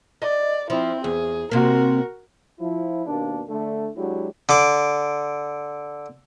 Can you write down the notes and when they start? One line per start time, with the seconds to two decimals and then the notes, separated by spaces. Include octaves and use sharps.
0.22 D5 D#5
0.70 F3 C4 E4
1.04 E2 G#4
1.51 C3 A#3 F#4 A#4
2.59 F3 E4
3.06 D#2 B2 A#3 D4
3.49 D3 A3 D4
3.96 F#3 G#3 D4 E4 F#4 G4
4.49 D3 D6